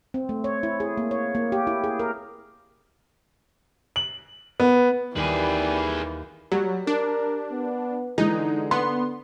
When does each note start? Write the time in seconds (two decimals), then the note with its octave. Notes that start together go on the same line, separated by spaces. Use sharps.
0.14 C4
0.29 A3
0.44 C#5
0.63 E4
0.80 G#4
0.97 A#3
1.11 C#5
1.35 A#3
1.52 G4
1.67 E4
1.84 G#4
1.99 A#4
3.96 F#7
4.60 B3
5.16 D#2 E3 G3 G4 G#4 B4
6.52 F#3 G3
6.87 D4 A#4
7.52 B3
8.18 D3 E3 G#3 D#4
8.71 B3 C6